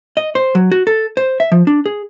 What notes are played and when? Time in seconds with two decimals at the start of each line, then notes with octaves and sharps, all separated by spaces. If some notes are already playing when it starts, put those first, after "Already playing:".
0.17 D#5
0.35 C5
0.55 F#3
0.72 F#4
0.87 A4
1.17 C5
1.40 E5
1.52 F3
1.67 D4
1.86 G#4